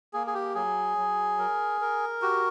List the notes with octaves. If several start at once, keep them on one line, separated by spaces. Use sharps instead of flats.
A#3 G#4
G#4
G4
F#3 G#4
F#3
A#4
A#4
F#4 G4